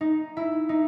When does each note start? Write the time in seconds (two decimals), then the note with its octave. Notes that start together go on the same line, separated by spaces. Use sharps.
0.01 D#4
0.37 E4
0.69 D#4